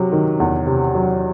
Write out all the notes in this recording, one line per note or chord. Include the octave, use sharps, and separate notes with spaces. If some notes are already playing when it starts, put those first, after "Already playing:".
Already playing: C3 F#3
D#3
E2
C3
F#3